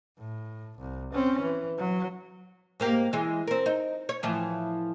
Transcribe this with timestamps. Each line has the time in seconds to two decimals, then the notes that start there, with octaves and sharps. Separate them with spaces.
0.19 A2
0.79 C2
1.13 C4 C#4
1.42 E3
1.78 F#3
2.80 G#2 A#3 G4
3.13 E3 G#3
3.47 C4 A#4
3.66 D#4
4.09 C#5
4.23 A2 E3 F3